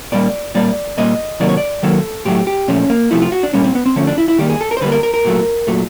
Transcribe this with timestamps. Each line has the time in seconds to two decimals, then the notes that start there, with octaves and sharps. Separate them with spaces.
0.12 A#2 G3 A#3 D5
0.55 A#2 G3 A#3 D5
0.97 A#2 G3 A#3 D#5
1.40 C3 D#3 F#3 A#3 D5
1.49 C#5
1.57 D5
1.83 D#3 F#3 A#3 A4
2.25 A2 F#3 A3 G4
2.47 G4
2.68 A#2 F3 A3 C#4
2.90 A#3
3.11 C3 F3 A3 E4
3.22 F4
3.32 F#4
3.43 D4
3.54 A#2 G3 A#3 C#4
3.64 C4
3.75 B3
3.86 C4
3.96 D3 F3 A3 C#4
4.07 D4
4.18 E4
4.28 E4
4.38 D#3 G3 A#3 G4
4.50 G#4
4.61 A4
4.71 A#4
4.77 C5
4.81 D3 G3 A#3 B4
4.92 A#4
5.03 A#4
5.14 A#4
5.25 A#2 F#3 A3
5.67 A#2 F#3 A3